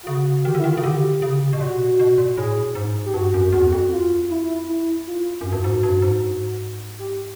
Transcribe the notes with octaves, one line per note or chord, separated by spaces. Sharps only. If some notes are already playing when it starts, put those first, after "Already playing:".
F4
C#3 F#4
D#3 G4
D3
E4
D#3 F4
C#3 F#4
D3 G4
C#3
B2
A#2 F#4
B2
A#2
A2 G#4
G#2
G4
G2 F#4
F#2
E2 F#4
F2
F4
E4
E4
F4
F#2 F#4
G2
G#2
G2
G#2
G4